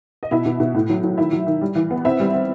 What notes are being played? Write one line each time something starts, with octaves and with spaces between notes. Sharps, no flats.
D#5
B2 E4 E5
B2
B2
A2
F#3
F#3
D#3 E4 E5
F#3
D#3
G3
E3
B3
C4 E4 E5
G3
C4